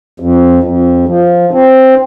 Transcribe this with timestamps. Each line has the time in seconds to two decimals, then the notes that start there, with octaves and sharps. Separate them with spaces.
0.20 F2
0.64 F2
1.08 F3
1.53 C4